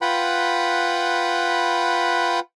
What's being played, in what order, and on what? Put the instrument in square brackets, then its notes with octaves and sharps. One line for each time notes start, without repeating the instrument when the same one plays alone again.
[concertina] F4 B4 F#5 G5 B5